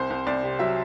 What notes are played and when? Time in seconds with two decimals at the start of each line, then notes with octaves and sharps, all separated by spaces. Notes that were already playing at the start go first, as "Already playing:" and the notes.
Already playing: C2 C5
0.10 C2
0.27 C2 D5
0.43 C3
0.59 F#3 E5